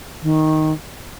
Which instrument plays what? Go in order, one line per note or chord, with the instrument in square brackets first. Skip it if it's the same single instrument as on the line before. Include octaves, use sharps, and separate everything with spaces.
[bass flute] D#3